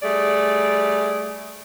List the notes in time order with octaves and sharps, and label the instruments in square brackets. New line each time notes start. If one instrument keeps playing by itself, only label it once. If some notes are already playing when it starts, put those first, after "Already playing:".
[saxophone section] G3 A3 G#4 D5